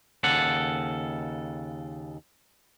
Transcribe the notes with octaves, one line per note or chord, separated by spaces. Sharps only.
D#2 C#3 A4 F#5